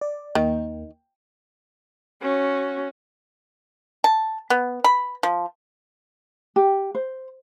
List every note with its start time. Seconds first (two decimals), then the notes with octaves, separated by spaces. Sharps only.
0.01 D5
0.35 D#2 D#3 A#3
2.22 C#4 F#4
4.04 A5
4.50 B3
4.84 B5
5.23 F3
6.56 G4
6.95 C5